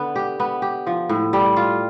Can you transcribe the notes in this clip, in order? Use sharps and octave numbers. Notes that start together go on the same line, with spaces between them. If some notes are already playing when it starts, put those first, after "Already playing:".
Already playing: D3 B3
G4
B3
G4
F3
A2
G3
F4